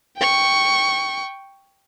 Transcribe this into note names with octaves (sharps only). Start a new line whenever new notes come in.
G5 C#6